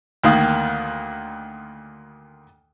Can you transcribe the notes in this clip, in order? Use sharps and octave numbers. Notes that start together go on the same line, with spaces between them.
D2 D#3 A#3 F5 D#6